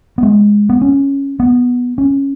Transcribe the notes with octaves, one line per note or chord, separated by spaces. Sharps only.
B3
G#3
B3
C#4
B3
C#4